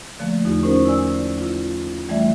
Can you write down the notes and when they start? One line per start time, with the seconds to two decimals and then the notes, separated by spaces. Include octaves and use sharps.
0.20 D3 F3 A3 A#3
0.45 E2 D#4 F4 G4
0.63 C#4 D#4 A#4 C5
0.86 E4 D5 G#5 E6
1.38 E4 F4
2.09 E3 G3 A3 D5 E5